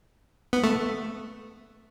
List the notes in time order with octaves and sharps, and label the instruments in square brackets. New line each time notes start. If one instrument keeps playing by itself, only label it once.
[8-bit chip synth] B3
A3